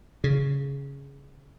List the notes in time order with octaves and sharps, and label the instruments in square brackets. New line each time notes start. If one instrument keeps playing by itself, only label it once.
[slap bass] C#3